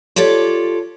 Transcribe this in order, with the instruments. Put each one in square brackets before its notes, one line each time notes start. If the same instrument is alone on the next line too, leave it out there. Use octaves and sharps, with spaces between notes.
[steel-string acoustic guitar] F4 G4 A4 C#5 D5